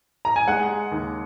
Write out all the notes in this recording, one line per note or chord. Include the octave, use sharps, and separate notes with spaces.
A#5
G#5
G#3 F#5
D#2